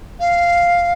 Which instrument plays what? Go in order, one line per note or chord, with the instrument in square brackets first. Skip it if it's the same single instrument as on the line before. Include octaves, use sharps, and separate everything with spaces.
[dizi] F5